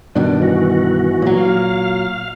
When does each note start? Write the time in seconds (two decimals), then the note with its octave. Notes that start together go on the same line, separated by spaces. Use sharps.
0.15 G2 B2 D#3 D4
0.42 E3 F#4
1.22 A#2 F#3
1.37 F5